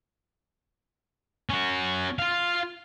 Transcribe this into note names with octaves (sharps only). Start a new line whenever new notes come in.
C#4 F#4
F4 F5